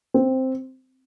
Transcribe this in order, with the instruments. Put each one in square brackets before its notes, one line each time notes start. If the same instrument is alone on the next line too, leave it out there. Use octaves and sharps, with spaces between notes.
[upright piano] C4